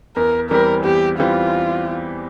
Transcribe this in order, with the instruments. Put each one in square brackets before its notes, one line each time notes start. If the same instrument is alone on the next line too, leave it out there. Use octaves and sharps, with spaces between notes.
[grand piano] E2 [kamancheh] A#4
[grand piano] E3 G3 C4 G4 [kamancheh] A#4
[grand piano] E2 [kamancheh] G4
[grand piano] E3 G3 C4 G4 [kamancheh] F4